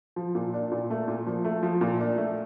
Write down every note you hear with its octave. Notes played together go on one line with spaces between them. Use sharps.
F3
A#2
D4
A#2
A3
A#2
F3
A3
F3
A#2
D4
A3